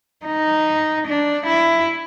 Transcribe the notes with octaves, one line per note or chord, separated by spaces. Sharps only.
D#4
D4
E4